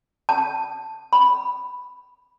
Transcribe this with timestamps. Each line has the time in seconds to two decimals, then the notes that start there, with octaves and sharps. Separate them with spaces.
0.29 A5
1.13 B5